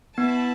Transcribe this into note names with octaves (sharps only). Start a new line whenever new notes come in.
B3 E4 B4 A5